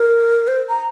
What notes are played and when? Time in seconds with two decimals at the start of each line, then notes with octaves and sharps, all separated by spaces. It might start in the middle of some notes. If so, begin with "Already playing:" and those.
Already playing: A#4
0.48 C5
0.69 A#5